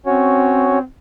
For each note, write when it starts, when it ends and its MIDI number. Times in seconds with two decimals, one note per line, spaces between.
0.06 0.84 60
0.06 0.79 61
0.06 0.79 66
0.06 0.79 73